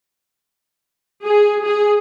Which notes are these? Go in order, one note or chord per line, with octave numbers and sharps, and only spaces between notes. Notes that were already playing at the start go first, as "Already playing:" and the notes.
G#4
G#4